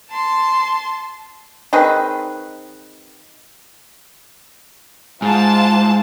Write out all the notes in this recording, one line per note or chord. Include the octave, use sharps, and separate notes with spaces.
A5 C6
D#3 C4 G#4 B4
G#2 F4 A5